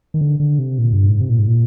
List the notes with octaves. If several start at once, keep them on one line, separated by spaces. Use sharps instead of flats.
D#3
D3
D3
C3
A#2
G2
G#2
C3
A#2
G#2
A#2